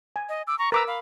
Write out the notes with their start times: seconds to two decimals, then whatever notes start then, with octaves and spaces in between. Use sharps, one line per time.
0.16 G#5
0.29 D#5
0.47 D6 E6
0.58 A#5 C#6
0.72 A#4 B4 A#5 D6 E6
0.87 F5 B5